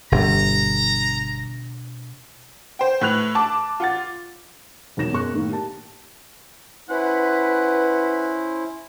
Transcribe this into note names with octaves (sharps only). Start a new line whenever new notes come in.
G1 B2 D4 A#5
C5 G5
A2 B4 F#6 F7
A5 D6
F4 F#5 A6
E1 D#3 F#3 A#6 E7
F#2 B2 G#4 C#6 F#6
A2 D#3 A#3
G4 A5
C#4 E4 B4 C5 F#5